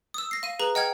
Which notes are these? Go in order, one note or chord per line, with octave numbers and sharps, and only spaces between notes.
D#6 E6
A#6 C7
F5 D#7
G#4 B4 A#5 F#7
D#5 F#5 G5 F6 G#6